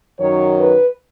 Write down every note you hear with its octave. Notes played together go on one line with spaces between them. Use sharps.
F#2 D#3 F#3 C#5
B4